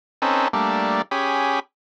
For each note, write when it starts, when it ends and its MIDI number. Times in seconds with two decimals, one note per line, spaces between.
0.22 0.48 60
0.22 0.48 61
0.22 0.48 63
0.22 0.48 69
0.22 0.48 71
0.53 1.02 55
0.53 1.02 57
0.53 1.02 58
0.53 1.02 62
1.11 1.60 61
1.11 1.60 67
1.11 1.60 68
1.11 1.60 83